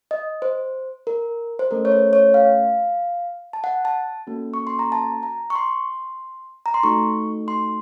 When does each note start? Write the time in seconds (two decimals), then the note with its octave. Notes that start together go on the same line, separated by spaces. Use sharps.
0.11 D#5
0.42 C5
1.07 A#4
1.59 C5
1.71 A3 C#4 A4 A#4
1.85 C#5
1.92 C5
2.13 C#5
2.34 F5
3.53 A5
3.64 F#5
3.85 A5
4.27 A#3 C#4 F#4 A4
4.54 C#6
4.67 C6
4.79 A#5
4.92 A5
5.23 A#5
5.50 C#6
5.55 C6
6.66 A#5
6.74 C6
6.83 A3 D#4 F#4 A4 C#6
7.48 C6